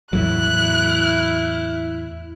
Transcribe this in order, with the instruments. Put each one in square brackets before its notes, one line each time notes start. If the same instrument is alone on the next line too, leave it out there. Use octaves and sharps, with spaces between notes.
[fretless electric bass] E2 A2 F#3 [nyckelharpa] E4 [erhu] F#6